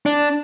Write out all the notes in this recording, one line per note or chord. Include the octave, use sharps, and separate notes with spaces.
D4